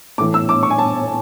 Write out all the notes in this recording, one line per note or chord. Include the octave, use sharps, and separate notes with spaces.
A2 E3 A3 D6
E6
D6
C#6
G#5
A5